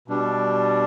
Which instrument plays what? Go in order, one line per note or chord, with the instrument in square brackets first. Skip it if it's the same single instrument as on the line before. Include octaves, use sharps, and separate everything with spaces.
[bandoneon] B2 G3 D4